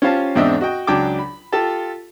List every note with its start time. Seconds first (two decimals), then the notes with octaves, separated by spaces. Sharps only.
0.02 C#4 F4 G4 C5 F5 A5
0.35 E2 G#2 C4 D4 D#5 E5
0.61 F#4 D#5 G5
0.87 C#2 F#3 D4 G5 A5 D6
1.19 B5
1.52 F4 G4 A4 A5